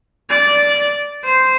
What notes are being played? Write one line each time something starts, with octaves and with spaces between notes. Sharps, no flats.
D5
C5